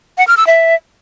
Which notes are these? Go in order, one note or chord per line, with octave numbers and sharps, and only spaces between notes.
F#5
F6
E6
E5